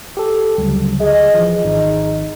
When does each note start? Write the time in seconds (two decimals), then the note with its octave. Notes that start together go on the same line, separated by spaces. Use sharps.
0.17 G4 A4
0.58 D2 C#3 F#3 G3
1.01 G#4 D#5
1.34 E3 F3
1.65 G#1 D#4